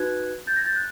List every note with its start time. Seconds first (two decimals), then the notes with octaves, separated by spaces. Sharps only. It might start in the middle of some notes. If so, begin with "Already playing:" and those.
Already playing: D#4 F#4 B4 F#6 G#6
0.47 G6 A6
0.56 G#6 A#6
0.66 G6 A6
0.76 F#6